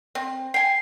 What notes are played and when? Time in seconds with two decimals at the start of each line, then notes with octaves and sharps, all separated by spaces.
0.15 C4
0.54 G5 G#5 C7